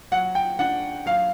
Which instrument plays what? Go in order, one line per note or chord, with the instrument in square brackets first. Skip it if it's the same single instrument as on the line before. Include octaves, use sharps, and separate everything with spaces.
[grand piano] F#3 F#5
G5
D4 F#5
F#3 F5